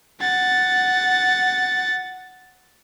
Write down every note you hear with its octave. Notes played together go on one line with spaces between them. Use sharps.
F#5 A6